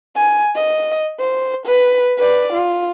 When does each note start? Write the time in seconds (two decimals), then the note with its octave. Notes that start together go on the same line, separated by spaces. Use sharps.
0.17 G#5
0.56 D#5
1.20 C5
1.66 B4
2.19 B4 D5
2.53 F4